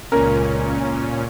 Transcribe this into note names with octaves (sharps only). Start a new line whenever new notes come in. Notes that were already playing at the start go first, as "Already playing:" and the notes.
C#2 A#2 C#4 A#4